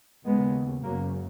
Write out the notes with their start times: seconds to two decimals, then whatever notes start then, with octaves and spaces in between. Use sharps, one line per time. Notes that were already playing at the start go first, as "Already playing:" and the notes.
0.25 D#2 C#3 G#3 B3
0.83 F#1 F#2 C#3 F#3 A#3